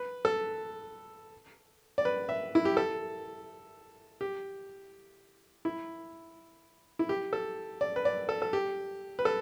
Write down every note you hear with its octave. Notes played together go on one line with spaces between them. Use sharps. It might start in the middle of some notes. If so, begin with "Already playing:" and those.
Already playing: B4
A4
D5
B4
E5
E4
G4
A4
G4
E4
E4
G4
A4
D5
B4
D5
A4
A4
G4
B4
A4